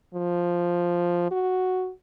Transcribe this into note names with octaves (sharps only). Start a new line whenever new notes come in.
F3
F#4